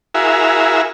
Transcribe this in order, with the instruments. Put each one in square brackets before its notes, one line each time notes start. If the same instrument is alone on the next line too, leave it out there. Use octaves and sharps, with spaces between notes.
[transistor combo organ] E4 F#4 G#4 A#4 E5 F5